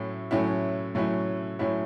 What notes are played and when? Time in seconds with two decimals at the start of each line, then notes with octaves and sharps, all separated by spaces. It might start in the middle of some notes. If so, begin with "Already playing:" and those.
Already playing: A2 F#3 C#4 E4
0.31 A2 F#3 C#4 E4
0.95 A2 F#3 C#4 E4
1.59 A2 F#3 C#4 E4